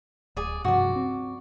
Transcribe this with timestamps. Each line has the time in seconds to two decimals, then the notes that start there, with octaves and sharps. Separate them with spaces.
0.37 D1 G#4 D5
0.65 G2 C3 F3 F#4 D5
0.96 C4